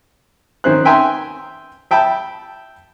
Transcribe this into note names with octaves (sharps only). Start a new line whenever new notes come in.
D#3 C#4 C5 F#6
E5 G5 G#5 A#5 C6
E5 G5 A5 B5